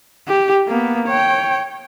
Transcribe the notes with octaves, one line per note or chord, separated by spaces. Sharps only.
G4
A#3 B3
C#5 G5